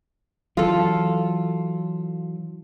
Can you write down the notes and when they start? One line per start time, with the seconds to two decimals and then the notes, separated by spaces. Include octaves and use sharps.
0.57 E3 F#3 F4 A4